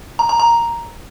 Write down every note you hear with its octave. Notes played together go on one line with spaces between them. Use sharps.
A#5
A#5
A#5